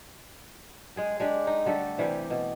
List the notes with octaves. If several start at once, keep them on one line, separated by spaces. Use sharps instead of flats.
G#3 G#4 G5
G#3 D4 G4
D#4
D3 G3 A3 A4
C3 E3 G3 G4
B2